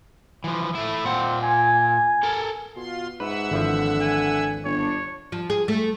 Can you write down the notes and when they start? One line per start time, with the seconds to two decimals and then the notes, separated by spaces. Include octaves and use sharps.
0.44 E3 F3
0.75 A3 E4
1.05 A#2 C4 F#5
1.42 G#5
2.23 A4 A#4
2.76 B2 F4 C6
3.20 G#2 B4 E5 F#5 E6
3.51 G#1 D3 E3 F3
4.01 G#5
4.65 G1 D4 C#5
5.32 F3
5.50 G#4
5.68 A3